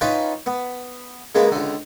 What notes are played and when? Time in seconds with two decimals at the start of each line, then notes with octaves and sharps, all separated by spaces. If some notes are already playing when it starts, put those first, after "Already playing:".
0.01 C#4 D#4 F4 B4 G5
0.46 B3
1.35 C#3 G#3 A#3 B3
1.51 C#2 D3